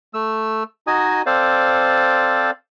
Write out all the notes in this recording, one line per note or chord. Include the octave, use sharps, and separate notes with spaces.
A3 E6
D#4 F#4 D#5 G#5 D#6
C4 A4 C5 D5 F5